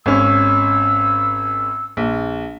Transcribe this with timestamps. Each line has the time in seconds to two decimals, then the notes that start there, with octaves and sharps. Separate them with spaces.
0.06 G#1 C#4 E6
1.97 A#1